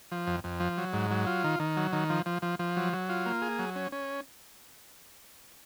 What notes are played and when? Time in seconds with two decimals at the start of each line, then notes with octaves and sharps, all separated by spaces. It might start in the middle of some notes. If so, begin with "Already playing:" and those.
0.11 F3
0.27 F2
0.44 F2
0.60 F3
0.78 F#3
0.93 G#2
1.11 F#3
1.26 F4
1.44 D#3
1.59 D#3
1.77 F#3
1.93 D#3
2.10 F3
2.26 F3
2.42 F3
2.59 F3
2.77 F#3
2.93 F#3
3.09 F4
3.26 A#3
3.42 G#4
3.59 F#3
3.76 C#4
3.92 C#4